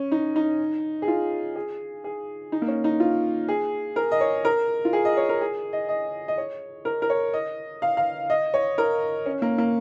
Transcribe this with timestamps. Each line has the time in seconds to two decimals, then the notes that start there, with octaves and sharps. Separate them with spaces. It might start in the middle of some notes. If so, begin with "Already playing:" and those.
Already playing: C#4
0.12 D#4
0.36 D#4
1.02 G#4
1.08 F4
1.56 G#4
2.04 G#4
2.52 D#4
2.62 A#3
2.68 C#4
2.84 D#4
3.00 F4
3.48 G#4
3.96 A#4
4.12 D#5
4.21 C#5
4.45 A#4
4.85 F4
4.93 G#4
5.05 D#5
5.17 C#5
5.29 A#4
5.41 G#4
5.73 D#5
5.89 D#5
6.28 D#5
6.38 C#5
6.85 A#4
7.02 A#4
7.10 C#5
7.33 D#5
7.82 F5
7.97 F5
8.30 D#5
8.54 C#5
8.78 A#4
9.26 C#4
9.42 A#3
9.58 A#3